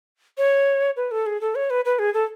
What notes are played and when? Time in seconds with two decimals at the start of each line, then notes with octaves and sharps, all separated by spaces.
0.38 C#5
0.96 B4
1.11 A4
1.26 G#4
1.41 A4
1.55 C#5
1.70 B4
1.85 B4
1.99 G#4
2.14 A4